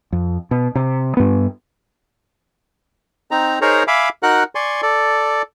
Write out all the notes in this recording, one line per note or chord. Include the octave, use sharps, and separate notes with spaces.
F2
B2
C3
G2 B3
C4 D#4 A#5
D#4 G#4 A#4 C5 C#5 A#5
E5 F5 G#5 B5 D6
D#4 F#4 A#4 F#5 F#6
D5 G#5 C6 C#6
A4 D5